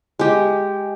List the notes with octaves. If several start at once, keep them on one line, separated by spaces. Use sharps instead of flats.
G#3 G4